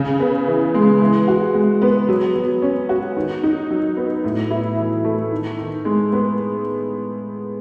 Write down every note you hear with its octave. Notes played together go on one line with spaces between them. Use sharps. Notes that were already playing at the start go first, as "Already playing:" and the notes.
Already playing: C#3
B3
E3
G#3
E3
F#4
G#3
B3
F#3
F#3
C#4
F#4
D#3
D#4
F#3
B3
A2
E4
E3
A3
D#3
D#3
G#3
B3